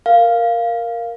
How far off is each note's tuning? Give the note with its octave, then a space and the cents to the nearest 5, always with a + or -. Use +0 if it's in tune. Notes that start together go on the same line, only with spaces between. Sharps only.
A#4 +0 F5 -5